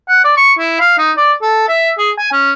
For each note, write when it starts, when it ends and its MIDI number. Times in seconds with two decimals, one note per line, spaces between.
0.08 0.20 78
0.24 0.33 74
0.37 0.53 85
0.59 0.78 64
0.80 0.96 77
0.98 1.12 63
1.17 1.32 74
1.42 1.66 69
1.68 1.90 76
1.98 2.11 68
2.18 2.30 80
2.32 2.52 61